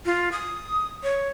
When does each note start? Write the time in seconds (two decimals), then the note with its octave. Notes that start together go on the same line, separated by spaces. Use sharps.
0.06 F4
0.32 D#6
1.03 C#5